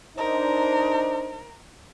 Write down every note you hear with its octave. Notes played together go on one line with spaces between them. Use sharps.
D4 D#4 A#4 C5